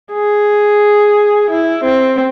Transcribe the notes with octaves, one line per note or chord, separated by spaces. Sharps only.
G#4
E4
C4